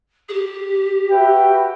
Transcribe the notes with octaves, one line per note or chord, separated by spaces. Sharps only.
G#4
G4
F#4 B4 E5 G5